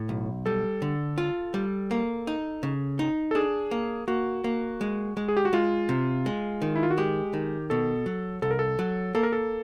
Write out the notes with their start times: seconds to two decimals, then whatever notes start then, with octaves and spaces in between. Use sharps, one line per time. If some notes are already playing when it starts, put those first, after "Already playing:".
Already playing: A2
0.09 B1
0.46 G3 A4
0.82 D3
1.18 F4
1.54 G3
1.91 A#3
2.27 D#4
2.63 C#3
2.99 D#4
3.31 A4
3.35 D4 G#4
3.71 A#3
4.08 A#3 F#4
4.44 A#3
4.81 G#3
5.17 G#3
5.28 G#4
5.37 G4
5.45 F#4
5.53 G#3 F4
5.89 C3
6.26 G#3
6.62 D#3
6.76 E4
6.83 F4
6.91 F#4
6.98 G#3 G4
7.33 D#3
7.70 B2 A4
8.06 F#3
8.42 C2 A4
8.51 A#4
8.59 A4
8.79 F#3
9.15 A#3 A4
9.23 A#4
9.32 A4